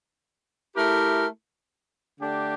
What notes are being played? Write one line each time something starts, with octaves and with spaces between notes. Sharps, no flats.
A3 E4 G4 A#4
D3 A3 D4 G4